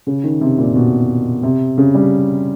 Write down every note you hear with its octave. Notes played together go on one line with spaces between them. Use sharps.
C#3
D#3
C3
A#2
B2
C3
C#3
G3